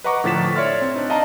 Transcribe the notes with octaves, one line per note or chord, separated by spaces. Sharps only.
B4 D#5 F#5 A#5 C#6 D6
A2 D3 F3 A6 B6 E7
C#5 D5 E5 C6 F6 A6
C4
D4 D#4
D5 D#5 F5 A5 A#5